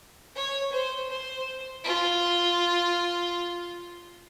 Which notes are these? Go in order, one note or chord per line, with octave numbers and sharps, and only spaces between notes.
C#5
C5
C5
F4